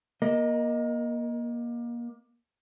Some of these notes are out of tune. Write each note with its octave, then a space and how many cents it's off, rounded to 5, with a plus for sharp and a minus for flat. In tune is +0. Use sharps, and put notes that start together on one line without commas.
A#3 +30 A#4 +0 D#5 +0